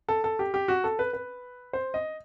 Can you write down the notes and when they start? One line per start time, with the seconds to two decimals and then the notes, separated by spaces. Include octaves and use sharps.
0.08 A4
0.24 A4
0.39 G4
0.54 G4
0.68 F#4
0.84 A4
0.99 B4
1.13 B4
1.73 C5
1.94 D#5